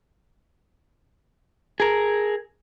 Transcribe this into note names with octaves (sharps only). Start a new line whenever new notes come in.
G#4 A#4